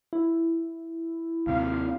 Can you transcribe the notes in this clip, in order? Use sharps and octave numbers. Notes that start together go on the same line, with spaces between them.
E4
D#2 C3 F5